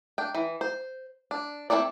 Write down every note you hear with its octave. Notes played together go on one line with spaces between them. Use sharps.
D4 G5
E3
C5
D4
C4 C#4 E4 A4 D5